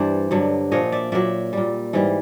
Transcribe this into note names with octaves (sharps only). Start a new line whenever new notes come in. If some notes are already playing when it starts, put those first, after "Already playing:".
Already playing: G2 E3 G3 C5 D5
G2 D3 F#3
A#2 F3 C#5 D#5
D5 E5
A#2 F#3 D5 E5
A#2 G3
G#2 E3 G3